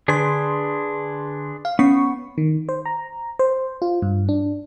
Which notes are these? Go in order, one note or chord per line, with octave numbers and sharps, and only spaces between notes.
D3 D4 G#4 B4 C6
F5
B3 C#4 C#6
D#3
C5
A#5
C5
F4
G2
D4